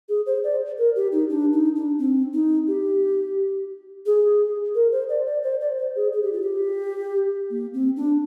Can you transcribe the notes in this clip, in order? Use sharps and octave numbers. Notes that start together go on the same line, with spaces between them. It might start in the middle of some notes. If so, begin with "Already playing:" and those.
G#4
C5
D5
A#4
G4
D#4
D4
D#4
D4
C4
D#4
G4
G#4
A#4
C5
D5
D5
C5
D5
C5
G#4
G#4
G4
F4
G4
A#3
C4
D4